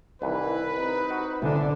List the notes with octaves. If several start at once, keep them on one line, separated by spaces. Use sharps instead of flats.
C2 D#3 E3 B4
C4 D#4
F#4
D3 E3 D4